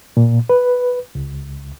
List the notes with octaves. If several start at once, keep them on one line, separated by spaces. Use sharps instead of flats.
A#2
B4
C#2